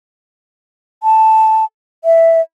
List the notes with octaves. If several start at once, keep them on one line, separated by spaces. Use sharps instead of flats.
A5
E5